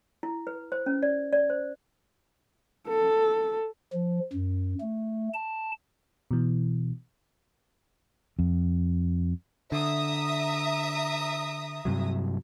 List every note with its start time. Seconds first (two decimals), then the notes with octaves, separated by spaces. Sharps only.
0.23 E4
0.47 B4
0.72 C5
0.86 C#4
1.03 D5
1.33 D5
1.50 C5
2.89 A4
3.93 F3
4.33 F#2
4.81 A3
5.34 A5
6.31 B2 E3
8.39 F2
9.72 D3 E5 A#5 D#6
11.85 G2 C3 F#3